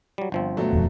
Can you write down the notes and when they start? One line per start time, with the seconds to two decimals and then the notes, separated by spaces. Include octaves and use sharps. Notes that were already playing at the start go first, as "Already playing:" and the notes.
0.18 F#3 G3
0.32 G1 F3 C4
0.57 B2 F#3 A3
0.72 D#1 F2